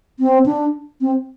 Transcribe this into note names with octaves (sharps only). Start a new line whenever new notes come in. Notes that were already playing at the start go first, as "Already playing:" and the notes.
C4
D4
C4